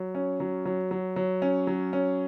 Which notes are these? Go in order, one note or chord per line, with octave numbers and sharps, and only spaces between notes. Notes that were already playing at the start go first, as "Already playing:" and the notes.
Already playing: F#3
C#4
F#3
F#3
F#3
F#3
C#4
F#3
C#4